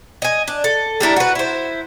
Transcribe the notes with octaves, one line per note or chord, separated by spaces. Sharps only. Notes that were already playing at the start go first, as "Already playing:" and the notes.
D#5 G#5
D4
A4
G3 D4 E4 A#4
F#4 B4
E4 C5